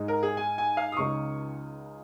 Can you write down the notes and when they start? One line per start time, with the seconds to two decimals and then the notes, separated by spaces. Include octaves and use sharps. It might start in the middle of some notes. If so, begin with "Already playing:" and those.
Already playing: G#2 G#3 D#4
0.08 A#4
0.23 G#4
0.37 G#5
0.58 G#5
0.77 F5
0.92 D#6
0.97 C#2 C#3 G#3 D#4 C#6